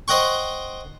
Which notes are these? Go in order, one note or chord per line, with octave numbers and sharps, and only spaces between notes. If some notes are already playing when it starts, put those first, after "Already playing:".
C5 D#5 F#5 G5 C#6